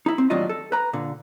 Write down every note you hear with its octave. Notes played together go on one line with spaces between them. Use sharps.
D#4 E4
C4
D#2 A2 F#3 D4 F4 D#5
A4
B4 A#5
A#2 D3